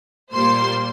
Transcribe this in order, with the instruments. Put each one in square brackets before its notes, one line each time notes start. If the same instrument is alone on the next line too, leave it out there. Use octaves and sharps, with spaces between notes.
[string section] A#2 G3 A#3 C5 C6